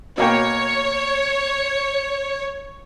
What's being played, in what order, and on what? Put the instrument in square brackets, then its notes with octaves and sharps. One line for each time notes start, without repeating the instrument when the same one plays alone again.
[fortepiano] B2 A#3 G5 [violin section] C#5